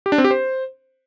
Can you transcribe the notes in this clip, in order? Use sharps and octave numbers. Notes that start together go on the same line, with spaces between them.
G4
D4
C4
G4
C5